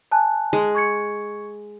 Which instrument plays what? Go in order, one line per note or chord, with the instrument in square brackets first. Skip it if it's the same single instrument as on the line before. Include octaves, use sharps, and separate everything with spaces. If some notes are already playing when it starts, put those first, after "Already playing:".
[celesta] G#5 A5 F#6
[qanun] G#3
[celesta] C#6 G#6 C#7